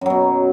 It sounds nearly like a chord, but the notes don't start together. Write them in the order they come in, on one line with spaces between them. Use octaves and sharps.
F#2 F#3 B2